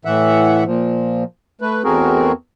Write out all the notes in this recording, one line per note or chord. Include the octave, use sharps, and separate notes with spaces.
A2 E3 E5 F#5
A#2 F3
A3 B4
E2 A3 C4 F#4 G#4 A#4